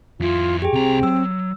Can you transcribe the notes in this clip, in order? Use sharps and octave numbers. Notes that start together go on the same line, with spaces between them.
F2 E4 F4
G4 G#4 G5
C2 C4 A#5
F#3 E6